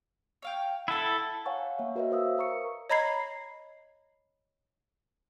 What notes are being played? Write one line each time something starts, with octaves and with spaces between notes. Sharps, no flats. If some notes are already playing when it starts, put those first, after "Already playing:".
C#5 F5 G5
E4 A4 F#5 B5
C#5 F5 F#5 G#5 A#5 C#6
A#3 C#5 E5
F#4 A#4 B4 C#5 D#5 E5
C5 F5 D#6 E6
A#4 A#5 C#6 C#7
C#5 D#5 A#5 B5 G#6 C7